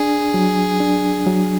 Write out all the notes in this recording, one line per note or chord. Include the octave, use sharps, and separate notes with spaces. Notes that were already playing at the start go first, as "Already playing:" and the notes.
Already playing: D4 G#4
F#3
D4
F#3